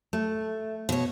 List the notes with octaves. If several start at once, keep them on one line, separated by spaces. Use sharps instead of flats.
A3
B2 C#5